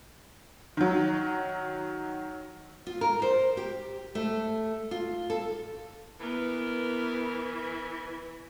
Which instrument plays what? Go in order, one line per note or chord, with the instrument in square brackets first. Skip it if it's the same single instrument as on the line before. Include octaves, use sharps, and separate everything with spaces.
[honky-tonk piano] D#3 F#3
[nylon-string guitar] F4
A#4
C5
G4
A3
F4
A4
[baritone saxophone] E3 [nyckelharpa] B3 A#4